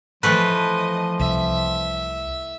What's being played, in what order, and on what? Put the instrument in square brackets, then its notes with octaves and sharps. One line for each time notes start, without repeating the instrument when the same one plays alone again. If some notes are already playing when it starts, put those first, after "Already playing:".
[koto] E3 A3 B4 [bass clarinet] F3 [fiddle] D#5
[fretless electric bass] C2 [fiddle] E5